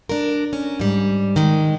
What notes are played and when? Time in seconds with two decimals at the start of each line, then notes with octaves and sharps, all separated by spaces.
0.09 D4 A#4
0.53 C#4
0.79 G#2 G3
1.36 D#3 G#3